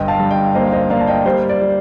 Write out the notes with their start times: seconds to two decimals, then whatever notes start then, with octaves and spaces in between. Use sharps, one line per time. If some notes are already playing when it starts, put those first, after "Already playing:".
Already playing: G1 D#5 G5
0.08 F5 A5
0.20 G2
0.31 D#5 G5
0.54 A#3 C5 D#5
0.67 F5
0.72 C5 D#5
0.90 A#3 D5 F5
1.01 A5
1.07 D#5 G5
1.26 G3 C5
1.49 D5
1.61 G3